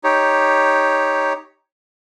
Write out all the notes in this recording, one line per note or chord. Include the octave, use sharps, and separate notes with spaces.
D#4 G4 C#5